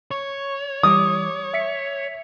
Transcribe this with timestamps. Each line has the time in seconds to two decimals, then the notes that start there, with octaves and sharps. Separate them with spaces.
0.11 C#5 C#6
0.83 E3 G3 D6 D#6
1.54 E5 B6 C#7